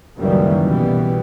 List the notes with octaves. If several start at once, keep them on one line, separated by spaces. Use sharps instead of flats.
C#2 F#2 D#3 E3 G3 A#3
B1 B2 E3 G3 B3